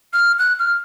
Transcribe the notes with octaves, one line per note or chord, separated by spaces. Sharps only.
F6
F#6
F6